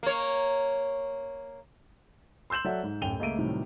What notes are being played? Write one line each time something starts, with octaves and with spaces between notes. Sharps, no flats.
A#3 C#5
C6 E6 G6 E7 F#7
F#3 A4 D5 E5 F#5
G#2
D1 F#2 G5 D#7 F7 G7
C#2 A3 A#3 E5 D7 D#7
A2 C3 D#3 F#3 G3